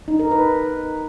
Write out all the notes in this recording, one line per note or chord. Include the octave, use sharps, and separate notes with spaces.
D#4
A#4
B4